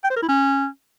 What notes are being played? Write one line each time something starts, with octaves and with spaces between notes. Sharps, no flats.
G5
C5
A#4
E4
C#4